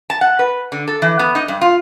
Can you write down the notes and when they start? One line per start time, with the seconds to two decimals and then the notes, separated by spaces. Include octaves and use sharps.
0.10 A5
0.21 F#5
0.39 B4
0.72 D3
0.88 A4
1.02 E3
1.19 B3
1.35 D#4
1.48 G2
1.61 F4